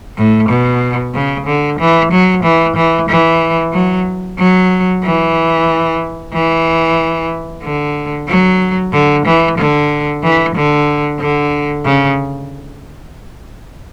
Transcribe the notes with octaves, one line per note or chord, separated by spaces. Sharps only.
A2
B2
C#3
D3
E3
F#3
E3
E3
E3
F#3
F#3
E3
E3
D3
F#3
D3
E3
D3
E3
D3
D3
C#3